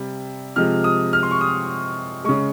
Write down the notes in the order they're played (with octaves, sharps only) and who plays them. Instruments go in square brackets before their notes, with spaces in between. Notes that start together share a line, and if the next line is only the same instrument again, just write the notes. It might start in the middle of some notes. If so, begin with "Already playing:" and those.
Already playing: [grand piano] C3 G3
C3 F3 G#3 F6
D#6
F6
C6
C#6
D#6
C#3 G#3 C#6